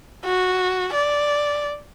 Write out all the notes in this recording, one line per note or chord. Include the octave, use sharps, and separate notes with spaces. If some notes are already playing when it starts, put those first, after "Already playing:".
F#4
D5